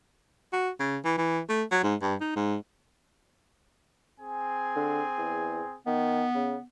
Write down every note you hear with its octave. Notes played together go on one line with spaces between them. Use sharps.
F#4
C#3
E3
E3
A3
F#3
G#2
G2
D#4
G#2
C4 G#4 G#5
D3
E2
D#3 B3
C#3